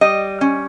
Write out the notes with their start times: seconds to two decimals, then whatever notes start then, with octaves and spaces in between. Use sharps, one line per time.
0.01 G3 D#5
0.41 C#4